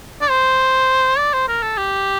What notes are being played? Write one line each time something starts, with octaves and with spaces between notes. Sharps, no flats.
D5
C5
D5
C5
A#4
A4
G4